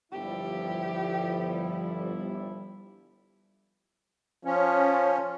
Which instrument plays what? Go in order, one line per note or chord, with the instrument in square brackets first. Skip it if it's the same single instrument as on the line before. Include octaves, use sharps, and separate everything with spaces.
[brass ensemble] G1 E4 [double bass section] F3 G3 [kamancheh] G4
[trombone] F3 [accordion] C#4